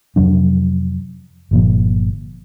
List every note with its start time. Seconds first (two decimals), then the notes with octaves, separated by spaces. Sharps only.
0.16 F2 C3 F#3 D4
1.51 G1 A#2 F3